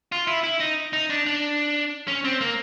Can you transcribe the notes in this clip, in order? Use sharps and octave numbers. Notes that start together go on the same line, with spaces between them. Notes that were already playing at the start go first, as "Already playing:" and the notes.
F4
E4
E4
D#4
D#4
D4
D4
C#4
C4
A#3